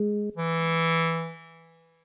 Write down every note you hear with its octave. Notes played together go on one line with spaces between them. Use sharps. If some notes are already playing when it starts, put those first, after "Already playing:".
Already playing: G#3
E3